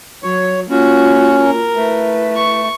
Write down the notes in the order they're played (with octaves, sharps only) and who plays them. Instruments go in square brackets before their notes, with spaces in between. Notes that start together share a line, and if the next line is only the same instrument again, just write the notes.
[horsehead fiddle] F#3 [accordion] C#5
[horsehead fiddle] A#3 F4 [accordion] C#4 [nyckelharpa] F#4
[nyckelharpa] A#4
[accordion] A3 [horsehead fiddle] E4 B4
[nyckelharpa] C#6